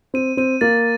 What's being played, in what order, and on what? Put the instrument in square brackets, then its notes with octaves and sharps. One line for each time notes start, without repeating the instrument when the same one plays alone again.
[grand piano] C4 [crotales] D#7
[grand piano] C4 [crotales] D#7
[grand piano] A#3 [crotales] A6